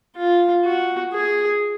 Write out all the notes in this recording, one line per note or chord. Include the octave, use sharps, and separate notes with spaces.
F4
F#4
G#4